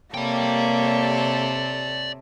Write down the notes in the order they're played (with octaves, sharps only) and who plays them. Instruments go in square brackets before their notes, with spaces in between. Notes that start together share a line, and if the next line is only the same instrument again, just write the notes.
[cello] C3 [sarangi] A#3 [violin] A4 C#5 [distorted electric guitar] D5 G5